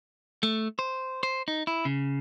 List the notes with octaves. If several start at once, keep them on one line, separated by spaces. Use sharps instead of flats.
A3
C5
C5
D#4
E4
C#3